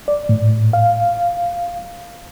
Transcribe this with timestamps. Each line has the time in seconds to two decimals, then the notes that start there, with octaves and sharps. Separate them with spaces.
0.08 D5
0.29 A2
0.73 F5